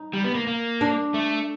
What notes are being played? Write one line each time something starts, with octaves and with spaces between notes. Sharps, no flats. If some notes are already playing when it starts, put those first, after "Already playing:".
Already playing: D#4
G3
B3
A#3
A#3
D4
A3